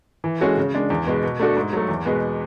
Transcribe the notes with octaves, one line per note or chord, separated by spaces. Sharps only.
E3
G#3 C#4 F#4 A4
C#3
G#3 D4
E2
B2 G#3 B3
B2
A3 D4 F#4 A4
G#2
F#3 A3
E2
B2 G#3 B3